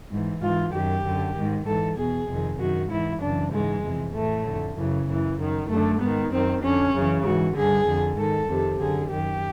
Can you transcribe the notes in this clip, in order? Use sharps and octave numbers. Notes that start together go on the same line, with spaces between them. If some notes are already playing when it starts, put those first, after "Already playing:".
G#2 E3
G#2 E3 F4
F#2 D#3 G4
F#2 D3
G#2 D#3
G#2 E3 A4
E2 B2 G#4
F2 C3 D#3
F#2 D#3 F#4
G#2 E3 E4
F#2 C#3 E3 D4
G#2 E3 G#3
F2 C3 E3
A2 E3 A3
F2 D3
F#2 C#3 E3
F#2 C#3 E3
F#2 D#3
F#2 D3 A3
G#2 D#3 B3
F#2 D#3 C4
F2 D3 C#4
F#2 C#3 E3
G#2 E3 F#4
G2 D3 G#4
F2 D3
G#2 D#3 A4
F2 C3 D#3
F#2 D3 G#4
F#2 D#3 G4